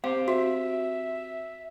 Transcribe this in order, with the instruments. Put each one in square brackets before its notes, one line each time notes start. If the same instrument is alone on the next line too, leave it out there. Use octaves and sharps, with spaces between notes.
[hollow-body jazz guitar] C4 G4 C5 [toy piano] F5
[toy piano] F#4 [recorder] E5